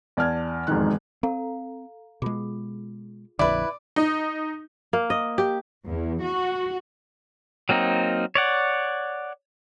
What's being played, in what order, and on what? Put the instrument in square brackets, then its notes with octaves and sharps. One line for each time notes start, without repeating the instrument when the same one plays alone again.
[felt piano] E2 D5 A5 F6 G#6
E1 F2 G#2 D#3 F#6
[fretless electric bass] C4 [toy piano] A4 F5 A#5
[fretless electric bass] B2 G#3 [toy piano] F4 G#4
[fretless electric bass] A#1 F2 D3 [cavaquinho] E4 B4 [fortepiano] D5
[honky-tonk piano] D#4
[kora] A#3
D#5
G4
[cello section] E2
F#4
[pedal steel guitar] F#3 A#3 C4 D#4
C#5 D5 F#5